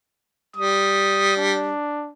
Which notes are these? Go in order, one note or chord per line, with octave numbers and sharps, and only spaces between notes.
G3 D#6
D4